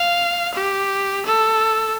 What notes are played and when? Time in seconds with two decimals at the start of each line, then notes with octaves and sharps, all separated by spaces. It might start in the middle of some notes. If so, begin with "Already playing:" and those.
Already playing: F5
0.55 G4
1.26 A4